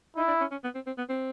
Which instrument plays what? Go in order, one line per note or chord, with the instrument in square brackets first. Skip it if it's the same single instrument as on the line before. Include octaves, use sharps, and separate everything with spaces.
[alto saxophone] D#4 [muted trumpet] E4
[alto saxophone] D4
C#4
C#4
B3
C4
C4
B3
C4